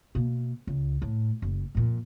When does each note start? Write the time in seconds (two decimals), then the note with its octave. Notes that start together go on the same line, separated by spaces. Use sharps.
0.15 B2 A#3
0.67 C#2
1.02 A2
1.42 F#1
1.75 F2 A#2